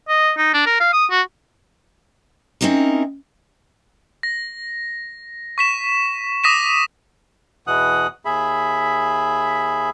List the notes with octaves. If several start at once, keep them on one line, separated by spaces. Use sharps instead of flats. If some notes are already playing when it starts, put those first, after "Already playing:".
D#5
D#4
D4
A#4
F5
D#6
F#4
C4 C#4 D#4 E4 A#4
A#6
C#6 B6 E7
D6 D#6 A#6 B6 D#7 E7
E2 B2 E3 F#5 D#6 F#6
D#2 G#4 E5 B5